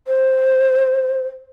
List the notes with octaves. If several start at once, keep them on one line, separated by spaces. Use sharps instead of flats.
C5